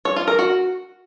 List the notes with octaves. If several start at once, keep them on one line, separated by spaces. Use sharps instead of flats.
C#5
F4
A#4
F#4